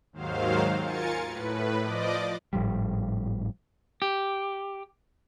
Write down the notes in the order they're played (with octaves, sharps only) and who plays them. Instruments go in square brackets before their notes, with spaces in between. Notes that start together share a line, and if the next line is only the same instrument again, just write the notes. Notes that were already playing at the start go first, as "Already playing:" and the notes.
[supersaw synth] D#2 G#2 D#3 F#3 C5 F5
F4 A#4 G#5 A6 C#7
A2 B4
F3 D5 D#5 D6
[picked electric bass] G#1 A2 F3 G3
[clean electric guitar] G4